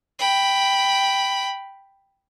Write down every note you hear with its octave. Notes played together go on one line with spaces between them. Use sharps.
G5 B5